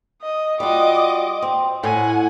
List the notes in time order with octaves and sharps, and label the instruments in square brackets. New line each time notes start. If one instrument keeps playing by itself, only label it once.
[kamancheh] D#5
[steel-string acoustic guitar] G3 F4 F#4 [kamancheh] D#5 D6
[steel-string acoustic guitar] C4
[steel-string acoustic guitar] A2 [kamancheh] F#5 G#5